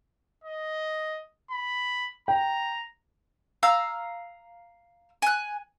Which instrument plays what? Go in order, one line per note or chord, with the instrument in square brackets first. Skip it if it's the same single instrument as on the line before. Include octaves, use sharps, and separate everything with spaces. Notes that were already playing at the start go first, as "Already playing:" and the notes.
[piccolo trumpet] D#5
B5
[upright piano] G5 [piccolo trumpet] A#5
[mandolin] F5 A#5 E6 F6
G#5 F#6